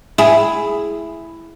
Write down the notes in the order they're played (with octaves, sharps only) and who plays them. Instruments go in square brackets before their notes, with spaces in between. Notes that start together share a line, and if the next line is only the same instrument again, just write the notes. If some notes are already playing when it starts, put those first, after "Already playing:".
[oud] E4 G#4